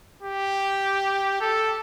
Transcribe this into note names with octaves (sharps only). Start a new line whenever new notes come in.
G4
A4